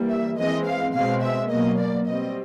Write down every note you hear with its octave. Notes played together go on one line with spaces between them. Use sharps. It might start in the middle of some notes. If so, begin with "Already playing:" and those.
Already playing: E3 G3 A#3
E5
E3 G#3 C4 D#5
F5
B2 G#3 C4 F5
E5
B2 F#3 A#3 D#5
D5
B2 G3 C4 D#5